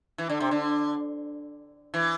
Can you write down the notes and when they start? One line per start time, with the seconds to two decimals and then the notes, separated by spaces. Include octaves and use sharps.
0.18 E3
0.29 D3
0.40 C3
0.51 D3
1.94 E3